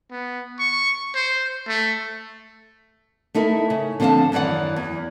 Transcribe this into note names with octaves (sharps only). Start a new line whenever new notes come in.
B3
C#6
C5
A3
A3 D#4 E4 A#4
C#3
D3 F3 C4 C5 F5 A5
F#2 D#3 E3 D5 F#5
E2